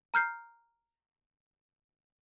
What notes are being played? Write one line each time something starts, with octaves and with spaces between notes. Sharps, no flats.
A#5 F6 G6 C7